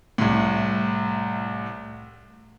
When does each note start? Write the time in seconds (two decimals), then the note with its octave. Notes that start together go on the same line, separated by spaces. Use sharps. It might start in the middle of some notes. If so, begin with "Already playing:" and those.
0.18 C2 A2